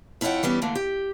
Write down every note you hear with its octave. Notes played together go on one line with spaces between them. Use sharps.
F2 E4 F4 C#5 F#5 G5
E3 G3 B3 C#4
D3 E3 A3 A#3
G4